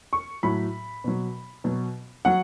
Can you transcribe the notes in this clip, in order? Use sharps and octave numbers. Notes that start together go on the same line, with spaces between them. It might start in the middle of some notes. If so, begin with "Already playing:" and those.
C#6
A2 F#3 B5
B2 F#3
B2 F#3
F#3 F#5